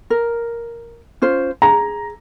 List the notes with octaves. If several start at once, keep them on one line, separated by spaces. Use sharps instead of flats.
A#4
C#4 F4 C5
G#4 A#5